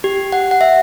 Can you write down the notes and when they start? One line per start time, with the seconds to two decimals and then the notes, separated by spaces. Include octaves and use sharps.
0.04 G4
0.32 F#5
0.51 F#5
0.61 E5